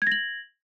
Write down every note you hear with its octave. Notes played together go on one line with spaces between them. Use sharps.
G#6 A#6 F#7